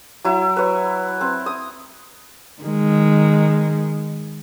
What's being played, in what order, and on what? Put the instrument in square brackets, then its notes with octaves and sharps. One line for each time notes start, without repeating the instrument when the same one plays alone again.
[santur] F#3 E4
B4 C#5
C4
D#6
[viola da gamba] D#3 G#3